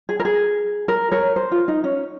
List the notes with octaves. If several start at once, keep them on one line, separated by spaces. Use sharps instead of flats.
G#4
A#4
G#4
A#4
A#4 C#5
C5
F4
D#4
C#4